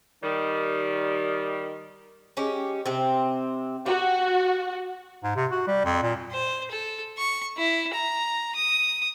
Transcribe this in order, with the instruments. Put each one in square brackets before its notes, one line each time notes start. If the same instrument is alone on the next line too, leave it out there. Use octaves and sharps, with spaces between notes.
[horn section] D#3 G3
[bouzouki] G#3 C#4 G4
C3 C4
[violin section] F#4 [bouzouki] G4
[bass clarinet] G#2
C3
F#4
G3
F2
A#2
[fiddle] C5
A4
C#6
E4
A#5
D#6